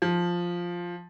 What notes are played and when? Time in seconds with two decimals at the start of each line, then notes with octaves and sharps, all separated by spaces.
0.02 F3